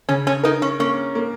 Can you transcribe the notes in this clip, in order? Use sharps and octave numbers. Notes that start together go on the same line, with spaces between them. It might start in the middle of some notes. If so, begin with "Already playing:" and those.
C#3 C#4
C#4
D#4 A#4
C#4
A#3 C#4
A#3